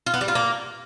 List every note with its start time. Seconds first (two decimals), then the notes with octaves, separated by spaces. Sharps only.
0.06 F4
0.14 B3
0.21 G3
0.28 F4
0.35 A#3